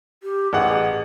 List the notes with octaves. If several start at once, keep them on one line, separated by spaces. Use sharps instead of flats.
G4
A1 G#4 F#5